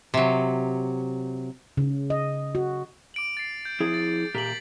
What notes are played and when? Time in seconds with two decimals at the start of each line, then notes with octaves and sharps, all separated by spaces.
0.14 C3 F#3
1.77 C#3
2.10 D#5
2.55 F#4
3.14 D6 D7 F#7
3.37 A6 C7
3.65 G6
3.80 F3 E4 G#4
3.94 A6
4.35 A#2 G4 A#5 B6 F#7